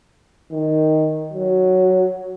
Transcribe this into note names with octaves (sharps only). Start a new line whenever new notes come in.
D#3
F#3